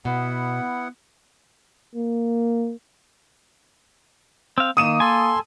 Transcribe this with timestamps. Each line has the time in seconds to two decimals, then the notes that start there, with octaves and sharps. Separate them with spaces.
0.05 B2 B3 E4 F#5
1.95 A#3
4.58 C4 F5
4.77 D#3 A#3 D#6 D#7 E7
5.00 A4 G#5 C6